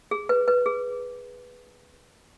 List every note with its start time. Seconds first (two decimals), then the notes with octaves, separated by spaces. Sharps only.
0.11 G#4
0.29 B4
0.48 B4
0.66 G#4